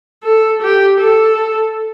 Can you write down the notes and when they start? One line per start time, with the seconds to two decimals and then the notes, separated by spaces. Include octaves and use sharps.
0.24 A4
0.62 G4
1.00 A4